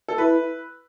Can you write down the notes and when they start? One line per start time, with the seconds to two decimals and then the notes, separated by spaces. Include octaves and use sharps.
0.08 A4
0.18 E4 B4